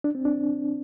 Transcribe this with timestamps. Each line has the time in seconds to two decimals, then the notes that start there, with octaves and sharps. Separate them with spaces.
0.04 D4
0.15 C4
0.25 D4